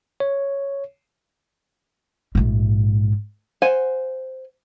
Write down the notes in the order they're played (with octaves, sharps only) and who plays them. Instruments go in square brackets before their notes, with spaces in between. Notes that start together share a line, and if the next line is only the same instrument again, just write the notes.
[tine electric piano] C#5
[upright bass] A#1 G#2
[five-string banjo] C5 F#5 G#5